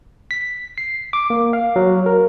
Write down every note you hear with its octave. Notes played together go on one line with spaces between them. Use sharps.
B6
C7
D6
A#3
F5
F#3
A#4